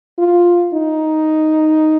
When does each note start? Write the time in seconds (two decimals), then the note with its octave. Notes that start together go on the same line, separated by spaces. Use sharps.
0.19 F4
0.74 D#4